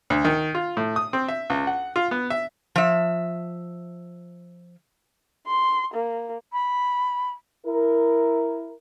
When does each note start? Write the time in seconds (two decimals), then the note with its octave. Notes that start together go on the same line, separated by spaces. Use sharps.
0.10 D2
0.25 D#3
0.55 F4
0.77 A2
0.96 D#6
1.13 C4
1.28 E5
1.50 C#2
1.67 F#5
1.96 F4
2.11 B3
2.30 E5
2.75 F3 E5
5.46 C6
5.94 A#3
6.53 B5
7.66 E4 A#4